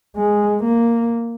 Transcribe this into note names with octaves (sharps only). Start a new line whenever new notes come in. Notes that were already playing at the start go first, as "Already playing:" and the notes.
G#3
A#3